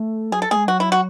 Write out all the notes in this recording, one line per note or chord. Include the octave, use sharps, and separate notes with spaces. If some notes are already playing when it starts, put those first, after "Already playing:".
Already playing: A3
F#3 G#4
A4
A3 G#4
G#3
F#3 F#4
E4
F#4